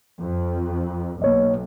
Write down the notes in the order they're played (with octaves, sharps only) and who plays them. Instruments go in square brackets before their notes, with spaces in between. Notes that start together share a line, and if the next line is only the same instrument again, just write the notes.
[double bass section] F2
[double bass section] B1 [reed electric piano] A#3 C#5 D#5